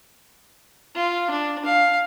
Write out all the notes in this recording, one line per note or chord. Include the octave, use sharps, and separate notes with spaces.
F4
D4
F5